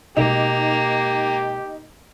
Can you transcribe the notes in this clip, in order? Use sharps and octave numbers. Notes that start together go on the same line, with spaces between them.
B2 G#3 A#3 D#4 G4